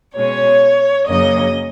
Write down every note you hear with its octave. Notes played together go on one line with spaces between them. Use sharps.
B2 G#3 C#4 C#5
F#2 C#3 F#3 A#3 C#4 D#5